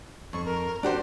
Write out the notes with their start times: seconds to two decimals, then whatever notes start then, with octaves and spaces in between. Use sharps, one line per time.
0.33 F2 C#6
0.45 A#4
0.83 D4 F#4 G4 C5